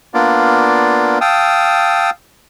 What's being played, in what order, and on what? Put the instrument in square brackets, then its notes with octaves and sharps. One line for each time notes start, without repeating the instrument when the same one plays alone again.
[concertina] A#3 B3 D4 F4 D5
F5 G5 A5 D#6 E6